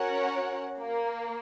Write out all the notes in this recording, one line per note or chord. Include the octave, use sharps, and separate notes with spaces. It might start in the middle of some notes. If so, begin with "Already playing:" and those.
Already playing: C#4 F#4 A#4 C#5 F#5
A#3